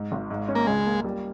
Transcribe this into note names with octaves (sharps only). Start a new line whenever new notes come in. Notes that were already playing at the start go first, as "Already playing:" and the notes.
Already playing: G#2
G#1
G#2
C#4
A#3
C#2 G#3
A#3
G3